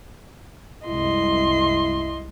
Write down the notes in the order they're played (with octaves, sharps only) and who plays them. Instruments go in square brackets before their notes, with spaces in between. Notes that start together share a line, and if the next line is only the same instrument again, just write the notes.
[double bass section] C2 F#2 G#3 [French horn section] E4 [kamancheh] D#5 C6